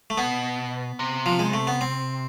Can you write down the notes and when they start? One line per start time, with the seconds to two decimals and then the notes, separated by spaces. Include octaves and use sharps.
0.10 A3
0.17 B2 B3
0.99 C3
1.26 F3
1.39 G#3
1.54 A3
1.67 B3
1.81 C4